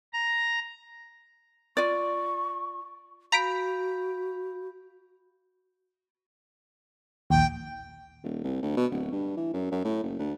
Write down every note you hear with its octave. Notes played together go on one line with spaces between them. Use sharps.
A#5
F4 D5 C#6
F#4 F5 A#5 B5 G6 B6 D7
A#1 D#2 G5
D#1
C2
D2
B2
D1
G2
E3
F#2
F#2
A2
F#1
D2